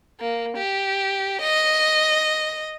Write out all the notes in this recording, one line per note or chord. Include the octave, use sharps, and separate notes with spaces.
A#3
G4
D#5